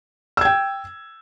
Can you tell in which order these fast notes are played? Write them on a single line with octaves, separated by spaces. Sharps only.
E6 G#6 G5